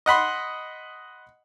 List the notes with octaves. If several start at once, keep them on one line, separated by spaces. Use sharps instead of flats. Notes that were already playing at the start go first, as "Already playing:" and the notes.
D#5 F#5 B5 C6